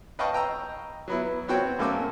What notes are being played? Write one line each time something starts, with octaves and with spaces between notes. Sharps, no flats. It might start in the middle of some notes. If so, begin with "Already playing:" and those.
B4 D#5 F5 G5 A5 C#6
D#5 G5 A#5 E6
F#3 B3 E4
B3 C4 F#4 C#5 G5
F#2 A3 A#3 G#5 D6 E6